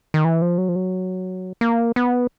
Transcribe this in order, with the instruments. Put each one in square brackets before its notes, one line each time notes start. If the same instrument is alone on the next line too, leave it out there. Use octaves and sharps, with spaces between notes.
[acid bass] D#3
E3
F3
F#3
F3
F#3
A#3
B3